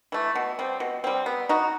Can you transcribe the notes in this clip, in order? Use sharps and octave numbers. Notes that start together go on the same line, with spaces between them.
E3 A3
B2
G3 C4
B2
G3 C4
B3
D#4 F#4